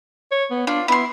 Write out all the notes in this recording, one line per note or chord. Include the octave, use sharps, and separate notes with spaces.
C#5
B3
D4 F4
B3 E4 C6